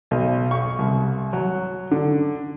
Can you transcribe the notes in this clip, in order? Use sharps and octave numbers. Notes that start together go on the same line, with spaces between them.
B1
C#6
C2
F#3
D3